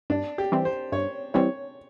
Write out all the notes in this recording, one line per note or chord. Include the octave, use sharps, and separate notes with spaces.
G2 D4
G4
E3 G3 C4
C5
G2 C#5
E3 G3 C4 C#5